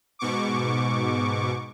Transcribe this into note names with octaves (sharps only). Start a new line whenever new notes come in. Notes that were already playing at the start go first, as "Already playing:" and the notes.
G#2 B2 C#6 D6